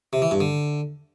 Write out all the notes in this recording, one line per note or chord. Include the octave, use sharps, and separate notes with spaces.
C3
E3
G2
D3